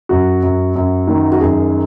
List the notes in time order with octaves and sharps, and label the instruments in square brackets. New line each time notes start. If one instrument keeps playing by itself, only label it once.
[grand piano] F#2 F#4
F#2
F#2
D#3
F#4
F#2 G#4